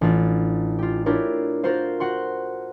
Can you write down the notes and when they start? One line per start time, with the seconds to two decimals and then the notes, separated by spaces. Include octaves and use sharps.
0.01 A1 D4 F4
0.79 F4 G4
1.06 D4 E4 F4 G4 A#4 C#5
1.63 F4 F#4 A#4 C5 F5
2.00 F#4 F#5 C6